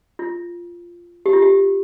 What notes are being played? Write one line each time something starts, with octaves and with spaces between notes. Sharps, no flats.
F4
G4
F4
G4